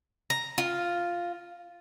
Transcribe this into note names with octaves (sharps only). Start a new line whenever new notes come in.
A#5
F4